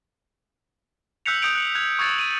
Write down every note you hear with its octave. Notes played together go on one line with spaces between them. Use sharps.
E6 F#6 G6 B6 C#7 F7
D#6 G6 C#7 D7 F7
F#6 C#7
F#6 G#6 F7
C#6 D#6 E6 G#6 A6 C#7
D#7 F#7